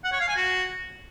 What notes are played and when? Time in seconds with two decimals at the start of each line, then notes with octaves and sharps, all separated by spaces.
0.04 F#5
0.12 C#5
0.20 F5
0.28 G#5
0.36 F#4